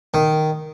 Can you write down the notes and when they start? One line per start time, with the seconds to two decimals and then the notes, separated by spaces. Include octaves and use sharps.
0.14 D#3